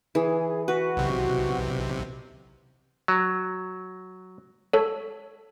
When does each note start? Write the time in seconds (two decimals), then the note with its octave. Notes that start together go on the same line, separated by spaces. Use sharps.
0.15 E3 G#4
0.68 F#4 B4
0.97 B1 C3
3.08 F#3
4.73 A4 C#5